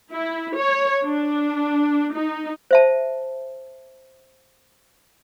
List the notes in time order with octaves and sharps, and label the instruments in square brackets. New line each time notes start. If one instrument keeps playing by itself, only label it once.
[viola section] E4
C#5
D4
D#4
[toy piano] C5 E5 A5